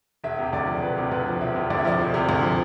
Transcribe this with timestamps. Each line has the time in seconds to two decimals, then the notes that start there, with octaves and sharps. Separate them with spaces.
0.24 E1 E5
0.38 C3
0.53 D2 D5
0.67 F3
0.82 E1 B4
0.97 C3
1.11 D2 B4
1.26 F3
1.41 E1 E5
1.55 C3
1.70 D2 D5
1.78 E5
1.85 F3 D5
1.99 E1 C5
2.14 C3
2.29 D2
2.43 F3